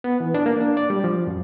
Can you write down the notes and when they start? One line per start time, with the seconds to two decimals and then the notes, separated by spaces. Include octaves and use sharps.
0.04 B3
0.20 E3
0.34 D4
0.46 A#3
0.60 D4
0.77 D5
0.90 G3
1.04 F3
1.27 F#2